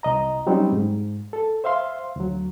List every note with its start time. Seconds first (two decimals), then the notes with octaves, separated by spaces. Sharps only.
0.03 C2 D#5 A#5
0.47 F#3 G3 C4 C#4 D#4
0.72 G#2
1.33 A4
1.64 C5 E5 F5 C6
2.16 D2 F#3